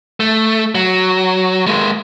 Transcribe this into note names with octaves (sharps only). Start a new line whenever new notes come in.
A3
F#3
G#3 A#3